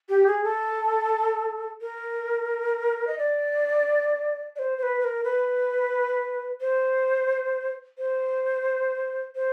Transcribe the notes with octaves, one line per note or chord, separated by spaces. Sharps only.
G4
G#4
A4
A#4
D#5
D5
D5
C5
C5
B4
B4
A#4
B4
C5
C5
C5